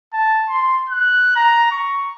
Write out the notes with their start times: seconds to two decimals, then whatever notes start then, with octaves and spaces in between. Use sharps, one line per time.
0.13 A5
0.49 C6
0.90 F#6
1.36 A#5
1.71 C#6